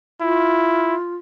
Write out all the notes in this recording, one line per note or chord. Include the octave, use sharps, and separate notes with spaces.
E4 F4